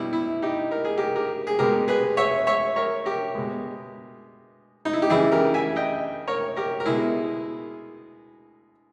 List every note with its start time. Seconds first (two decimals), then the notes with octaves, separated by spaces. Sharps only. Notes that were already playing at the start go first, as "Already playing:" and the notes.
Already playing: B2 G3 E4
0.13 E4
0.42 D#4 G4
0.71 A#4
0.85 G#4
0.98 G4 A#4
1.16 G4 A#4
1.47 G#4
1.59 B2 G#3 G4 A#4
1.88 G#4 B4
2.17 C#5 E5
2.47 C#5 E5
2.76 A#4 C#5
3.05 G4 A#4
3.35 B2 G#3
4.85 D#4
4.93 E4
5.02 G4
5.10 C#3 E3 G3 E4 G#4
5.32 G4 A#4
5.54 E5 G#5
5.76 D#5 G5
6.27 A#4 C#5
6.56 G4 A#4
6.80 A#4
6.86 B2 G#3 E4 G#4